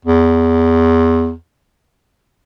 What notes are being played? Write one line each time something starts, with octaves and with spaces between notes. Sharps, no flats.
E2